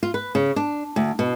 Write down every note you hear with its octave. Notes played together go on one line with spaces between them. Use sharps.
F4
B4
C#3
D4
D2
B2